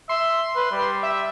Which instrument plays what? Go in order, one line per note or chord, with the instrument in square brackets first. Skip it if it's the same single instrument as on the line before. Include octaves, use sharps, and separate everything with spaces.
[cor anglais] E5 [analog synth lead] C6
[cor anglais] B4
G3
[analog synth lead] E5